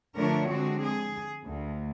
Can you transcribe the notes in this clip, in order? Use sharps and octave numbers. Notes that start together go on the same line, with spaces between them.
D3 F3 A3 D4 A#4 C#5
D3 G#3 C4 F#4
G#4
D2